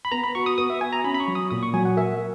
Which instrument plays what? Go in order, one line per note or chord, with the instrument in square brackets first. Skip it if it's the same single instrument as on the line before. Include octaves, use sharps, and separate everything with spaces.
[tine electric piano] B5
[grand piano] B3 [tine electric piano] A#5
[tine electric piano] B5
[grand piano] F#4 [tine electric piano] C#6
[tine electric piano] D#6
[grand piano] B3 [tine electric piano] D#6
[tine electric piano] E5
[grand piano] F#4 [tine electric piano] G#5
[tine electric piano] A#5
[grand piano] C#4 [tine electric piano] B5
[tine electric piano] B5
C#6
[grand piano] F#3
[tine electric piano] D#6
[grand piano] A#2 [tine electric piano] D#6
[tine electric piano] C#6
[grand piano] F#3 [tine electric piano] G#5
[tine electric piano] F#5
[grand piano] A#4 [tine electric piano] E5